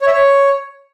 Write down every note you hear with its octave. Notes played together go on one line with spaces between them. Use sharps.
C#5
E5
C#5